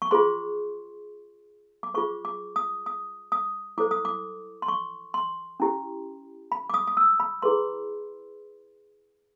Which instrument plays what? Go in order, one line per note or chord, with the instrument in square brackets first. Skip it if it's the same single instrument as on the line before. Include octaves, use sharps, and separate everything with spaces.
[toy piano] C#6
F4 G#4 C5 C6
D6
F4 G#4 C5 C#6
D6
D#6
D#6
D#6
E4 A4 C5 D6
D#6
D6
C6
C#6
C6
C#4 E4 G4
B5
D6
D#6
D#6
E6
B5
E4 G#4 B4 C6